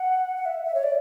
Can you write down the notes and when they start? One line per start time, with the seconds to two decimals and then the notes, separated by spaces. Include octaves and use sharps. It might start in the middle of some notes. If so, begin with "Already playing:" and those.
Already playing: F#5
0.36 F#5
0.45 E5
0.65 E5
0.74 C#5
0.83 D5